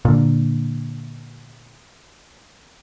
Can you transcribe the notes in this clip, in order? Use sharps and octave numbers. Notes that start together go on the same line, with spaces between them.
A#2 D3